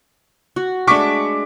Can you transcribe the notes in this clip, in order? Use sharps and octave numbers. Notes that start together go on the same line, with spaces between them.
F#4
G#3 A3 D4 C#6 D6 B6